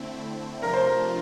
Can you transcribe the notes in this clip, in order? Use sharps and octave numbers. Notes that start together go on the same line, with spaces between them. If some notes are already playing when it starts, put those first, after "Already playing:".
Already playing: D3 A3 C4 E4
C3 F3 A3 D4 F4 A#4
C5
A#4